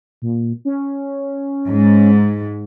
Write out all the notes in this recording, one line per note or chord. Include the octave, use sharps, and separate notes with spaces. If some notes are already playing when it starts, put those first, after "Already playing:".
A#2
C#4
G#2